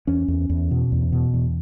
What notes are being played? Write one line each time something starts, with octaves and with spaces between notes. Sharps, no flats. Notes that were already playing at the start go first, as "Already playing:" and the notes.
E2 C#4
E2
E2
B2
E2
B2
E2